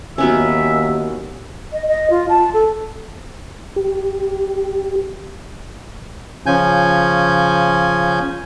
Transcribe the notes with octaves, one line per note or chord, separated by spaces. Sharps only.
D#2 F#3 B3 C#4 E5
D#5
D#5
F4
A5
A4
G4
C#3 F3 C#4 G#5 G6